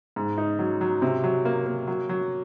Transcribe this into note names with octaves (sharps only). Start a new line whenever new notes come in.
G#2
D#4
F#3
F#3
C3
F#3
A#3
A#3
F#3
F#3